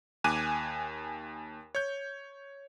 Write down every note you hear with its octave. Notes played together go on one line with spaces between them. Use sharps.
D#2 G#5 D6 F#6 D#7
C#5 G6